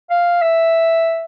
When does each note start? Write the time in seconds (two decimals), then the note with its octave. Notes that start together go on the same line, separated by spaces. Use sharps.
0.11 F5
0.42 E5